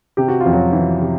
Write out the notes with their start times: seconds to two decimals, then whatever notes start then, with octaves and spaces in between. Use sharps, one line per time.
0.17 C3 G4
0.28 F#4
0.40 F4
0.46 F2
0.53 F#3 F#4
0.73 E3
1.01 C3